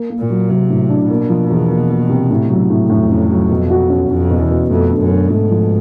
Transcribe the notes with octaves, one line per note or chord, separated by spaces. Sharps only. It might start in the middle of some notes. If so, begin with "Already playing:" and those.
Already playing: A#3
A#3
A#2
F#3
C3 F#3
A2
D4
B2 A#3
F3
E2
A#3
A#3
C3
A2
F#3
A2
F2 A2
C#4
F#3
B2
F#4
C#4
F2 C#4
B2
E2
B2
F2 A3
D3
F#2
D3
G#2 A3
F3